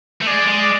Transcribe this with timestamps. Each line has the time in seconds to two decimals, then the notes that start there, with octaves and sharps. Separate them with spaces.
0.22 A3
0.27 G#3 D5
0.48 G#3